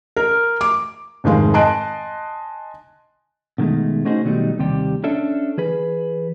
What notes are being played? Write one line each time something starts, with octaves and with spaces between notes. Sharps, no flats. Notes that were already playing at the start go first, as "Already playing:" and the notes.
A#4
D6
F1 G#2 D#3 G#3 F5
D#5 G#5 A5 C6 F#6 D7
B2 D3 D#3 G#3 A3
A3 C#4 D#4 F#4 G#4 C5
B2 D#3 F#3 G3 A3 D#4
D#2 C3 G3 G4
C#4 D4 A4 E5
E3 G#4 B4